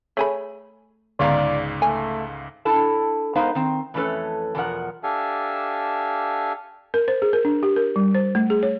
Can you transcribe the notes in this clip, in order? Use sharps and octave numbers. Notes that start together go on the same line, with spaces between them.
A3 G#4 C#5 B5
C#2 G#2 D3 B3 D5 F5 A#5
A3 G#5
D4 E4 A4 A5
G#3 B3 D#4 A#4 C5 F5
D#3 C4
F2 E3 A3 C#4 A4 B4
E2 B2 F3 A#4 F#5
D4 G4 A4 E5 F5 G#5
A#4
C5
G#4
A#4
D4
G4
A#4
G3
C5
A3
G#4
C#5